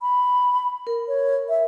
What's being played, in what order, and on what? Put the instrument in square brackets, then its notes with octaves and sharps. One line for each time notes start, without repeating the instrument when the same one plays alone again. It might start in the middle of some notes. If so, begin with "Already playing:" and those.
[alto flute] B5
[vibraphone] A#4
[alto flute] C#5
E5